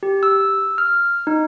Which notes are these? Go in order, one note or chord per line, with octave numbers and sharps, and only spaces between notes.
G4
E6
F6
D#4